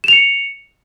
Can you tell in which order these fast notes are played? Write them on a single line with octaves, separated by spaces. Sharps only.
E7 F7 C#7